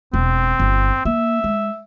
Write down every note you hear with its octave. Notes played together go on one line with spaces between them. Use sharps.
E1 C4
G1
A#3 E5
G#3